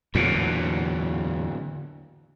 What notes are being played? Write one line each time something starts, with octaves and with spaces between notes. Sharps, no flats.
E2 A#2 D3 F#3